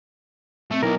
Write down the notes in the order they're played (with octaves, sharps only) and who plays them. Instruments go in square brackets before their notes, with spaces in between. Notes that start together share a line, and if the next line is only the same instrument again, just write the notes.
[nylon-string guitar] B2 C4 [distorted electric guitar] A3
[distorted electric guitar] B1 [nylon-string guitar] B3 E4 [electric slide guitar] A#4